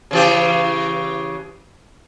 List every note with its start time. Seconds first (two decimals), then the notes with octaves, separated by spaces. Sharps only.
0.11 C#3 E3 G4